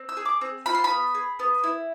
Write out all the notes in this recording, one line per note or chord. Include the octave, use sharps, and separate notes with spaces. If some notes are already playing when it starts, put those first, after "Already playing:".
Already playing: C4
E6
G#4
D6
C4
F4 B5
C6
B5
B3
G#4
B3
E4